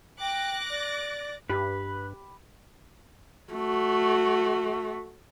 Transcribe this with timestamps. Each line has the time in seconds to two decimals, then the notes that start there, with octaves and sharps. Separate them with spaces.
0.21 G5 D6 F#6 A#6
0.70 D5
1.50 G2 G4 B4 B5
3.53 A3 F#4